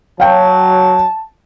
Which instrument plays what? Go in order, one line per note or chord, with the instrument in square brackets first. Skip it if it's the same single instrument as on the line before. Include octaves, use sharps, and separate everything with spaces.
[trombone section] F#3 [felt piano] F5 G5 [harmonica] A5